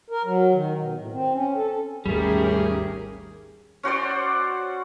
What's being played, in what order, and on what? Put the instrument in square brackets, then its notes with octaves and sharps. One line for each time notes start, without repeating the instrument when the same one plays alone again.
[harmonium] A#4
F#3
D#3
B2
A2
C4
C#4
A4
[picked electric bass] G#1 D#2 [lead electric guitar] G3 A3 [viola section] C#4 G4 A#4 [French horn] G#4
[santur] C#4 F#4 C5 D5